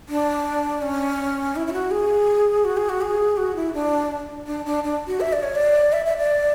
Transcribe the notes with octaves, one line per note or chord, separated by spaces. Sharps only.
D4
C#4
E4
E4
F#4
G#4
F#4
G#4
F#4
G#4
F#4
E4
D4
D4
D4
D4
F#4
E5
D5
C#5
D5
E5
E5
D5